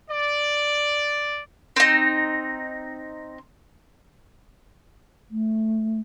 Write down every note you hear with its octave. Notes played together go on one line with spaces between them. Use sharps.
D5
C4 D#4
A3